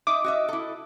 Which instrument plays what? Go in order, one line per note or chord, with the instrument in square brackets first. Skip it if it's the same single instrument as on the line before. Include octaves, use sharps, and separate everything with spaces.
[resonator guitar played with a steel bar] D#4 E5 [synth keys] D6 D#6
[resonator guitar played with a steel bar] F#4 D#5 E5
E4 A4